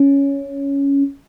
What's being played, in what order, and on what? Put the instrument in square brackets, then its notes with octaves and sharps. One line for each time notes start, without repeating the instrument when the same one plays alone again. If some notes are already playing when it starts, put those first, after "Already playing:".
Already playing: [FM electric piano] C#4